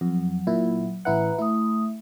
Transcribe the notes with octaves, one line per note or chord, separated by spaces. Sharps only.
F2 F#3
A#2 E4
A1 E4 B4 E5 F#5 A#5
A3 E4 D#6